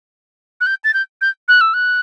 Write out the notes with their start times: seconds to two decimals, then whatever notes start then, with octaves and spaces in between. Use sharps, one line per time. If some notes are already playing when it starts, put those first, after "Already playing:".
0.61 F#6
0.66 G6
0.84 A6
0.94 G6
1.21 G6
1.48 F#6
1.61 E6
1.74 F#6